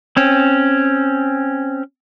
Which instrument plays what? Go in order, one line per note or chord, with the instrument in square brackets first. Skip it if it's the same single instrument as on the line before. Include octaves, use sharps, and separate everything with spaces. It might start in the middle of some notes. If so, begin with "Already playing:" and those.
[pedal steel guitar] C4 C#4